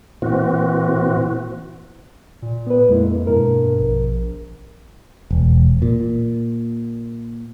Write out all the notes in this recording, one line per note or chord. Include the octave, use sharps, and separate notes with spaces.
A#2 E3 C4 F#4
A#2
B3 B4
F2 G#3 A#3 E4
G2 B2 A#4
A#1
E1
A#2